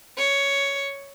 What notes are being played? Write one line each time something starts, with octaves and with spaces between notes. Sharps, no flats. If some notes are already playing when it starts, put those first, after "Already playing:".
C#5